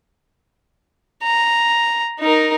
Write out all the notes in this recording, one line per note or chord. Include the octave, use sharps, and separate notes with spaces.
A#5
D#4 A#4